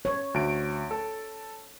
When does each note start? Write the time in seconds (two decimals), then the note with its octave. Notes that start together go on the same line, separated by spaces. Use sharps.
0.05 C#5
0.34 D2 D7
0.91 A4